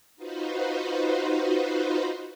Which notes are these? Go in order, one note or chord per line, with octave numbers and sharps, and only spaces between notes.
D#4 F4 F#4 B4 C5